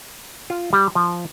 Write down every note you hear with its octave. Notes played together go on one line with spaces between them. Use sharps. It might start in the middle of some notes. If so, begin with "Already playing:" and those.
F4
G3
F3